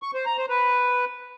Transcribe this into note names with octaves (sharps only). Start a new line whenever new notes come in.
C#6
C5
A#5
C5
B4